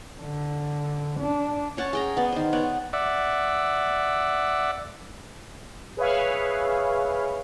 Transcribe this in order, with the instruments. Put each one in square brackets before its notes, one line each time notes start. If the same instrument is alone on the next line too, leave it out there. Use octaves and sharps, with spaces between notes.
[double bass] D3
D4
[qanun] C#4 C#5 F#5 A5
G#4 G5 A#5
B3 D5
D#3 C5
B3 C#5 D5 F#5
[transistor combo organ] D5 E5 F#5
[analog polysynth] G#4 B4 C#5 E5 F5